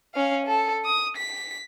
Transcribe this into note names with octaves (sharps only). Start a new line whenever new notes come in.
C#4 F5
A4
D#6
B6